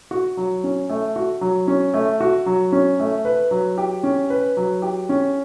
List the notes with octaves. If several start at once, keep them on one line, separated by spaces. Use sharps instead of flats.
F#4
F#3
C#4
A3
F#4
F#3
C#4
A3
F#4
F#3
C#4
A3
B4
F#3
G4
C#4
B4
F#3
G4
C#4